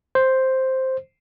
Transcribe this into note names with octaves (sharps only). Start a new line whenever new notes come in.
C5